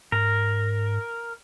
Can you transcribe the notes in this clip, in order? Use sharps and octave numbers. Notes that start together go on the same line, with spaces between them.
G#2 A#4